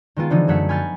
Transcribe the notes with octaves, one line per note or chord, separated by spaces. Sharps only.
D#3 G#3 B3 F4
D3 E3 F3 G#3 D#4
F#2 F#3 A3 F#5 B6
G#5 B5 C#6 F6 G6 A6